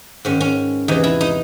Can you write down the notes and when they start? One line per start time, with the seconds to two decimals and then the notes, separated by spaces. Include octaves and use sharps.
0.25 G#2 D#3 C#4
0.41 C#4
0.88 E2 C3 E3 D#4
1.04 E4
1.21 D#4